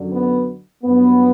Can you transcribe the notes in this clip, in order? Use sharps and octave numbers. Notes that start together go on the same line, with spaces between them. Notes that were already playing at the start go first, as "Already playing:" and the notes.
Already playing: F#2 D3 F#3
B3
G2 F#3 B3